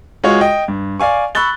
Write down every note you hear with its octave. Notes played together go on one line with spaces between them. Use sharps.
G#3 F4 F#4 C#5
D#5 G5
G2
D5 F5 G#5 C#6
B5 C#6 E6 F#6 A6 G7